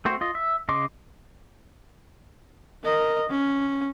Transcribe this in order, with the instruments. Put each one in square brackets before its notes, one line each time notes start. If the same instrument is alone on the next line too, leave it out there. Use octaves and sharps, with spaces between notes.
[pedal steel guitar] A3 C4 F#4 C5
F4 D#5
E5
C#3 D#5 C6 D6
[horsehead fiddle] A#4 D#5
C#4